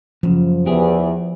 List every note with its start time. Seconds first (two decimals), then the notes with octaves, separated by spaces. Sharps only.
0.23 F#2 A2 C#3 F3
0.66 E2 G4 G#4